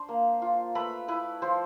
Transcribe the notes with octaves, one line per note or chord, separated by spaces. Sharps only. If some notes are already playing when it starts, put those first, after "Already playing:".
Already playing: D4 C5 C6
A#3
F4
A3 B4 B5
E4 B4 B5
F3 C5 C6